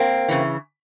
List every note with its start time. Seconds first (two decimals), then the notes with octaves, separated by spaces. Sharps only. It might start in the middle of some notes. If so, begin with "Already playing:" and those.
Already playing: A#3 C4
0.28 C#3 E3